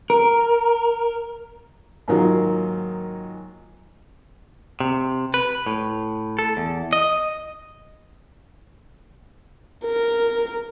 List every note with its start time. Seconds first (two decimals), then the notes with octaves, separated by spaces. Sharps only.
0.10 A#4
2.08 G#2 D#3 F#3 A#3 F4
4.80 C3
5.34 B4
5.66 A2
6.39 A4
6.57 E2
6.93 D#5
9.85 A#4